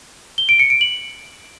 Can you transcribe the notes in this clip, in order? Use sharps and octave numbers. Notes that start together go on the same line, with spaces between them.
G7
D7
C#7
D7
F#7